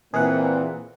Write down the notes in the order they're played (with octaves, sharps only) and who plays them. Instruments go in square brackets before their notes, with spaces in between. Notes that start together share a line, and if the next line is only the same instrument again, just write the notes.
[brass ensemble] A#2 A#3 [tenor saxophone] E3 [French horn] C4 [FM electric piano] G#4 F#5